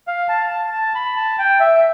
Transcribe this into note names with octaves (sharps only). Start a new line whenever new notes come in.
F5
A5
A5
A5
B5
A5
G5
E5